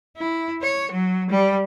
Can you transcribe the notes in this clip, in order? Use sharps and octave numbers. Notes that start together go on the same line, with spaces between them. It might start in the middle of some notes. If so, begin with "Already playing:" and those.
E4
C#5
F#3
G3